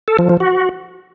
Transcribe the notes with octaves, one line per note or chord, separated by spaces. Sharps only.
A4
F3
F3
F#4